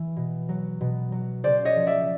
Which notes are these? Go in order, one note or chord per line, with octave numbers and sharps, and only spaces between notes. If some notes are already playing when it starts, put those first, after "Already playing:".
Already playing: E3
B2
F#3
B2
F#3
C#3 C5 D5
C#5 D#5
F3
D5 E5